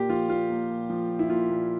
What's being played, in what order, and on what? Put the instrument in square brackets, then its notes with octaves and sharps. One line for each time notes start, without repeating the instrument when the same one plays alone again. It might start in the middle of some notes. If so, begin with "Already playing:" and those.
Already playing: [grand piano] A#2 A#3 G4
F3 F4
A#2 F4
A#3
A#2
F3
A#2
E4
A#3 F4
A#2